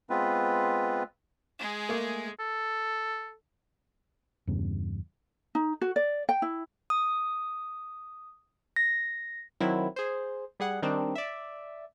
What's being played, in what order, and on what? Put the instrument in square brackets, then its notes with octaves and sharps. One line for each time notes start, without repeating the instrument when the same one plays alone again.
[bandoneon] G#3 B3 C4 F4 B4
[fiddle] G#3 G#4
[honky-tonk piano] A3 A#3
[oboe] A4
[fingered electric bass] E2 G2 C#3
[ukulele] D#4
F#4
D5
G5
E4
[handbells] D#6
A#6
[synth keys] D#3 F#3 C4 E4
G#4 C5
G3 G#4 F#5
D#3 G3 C4 D4 D#4
D5 E5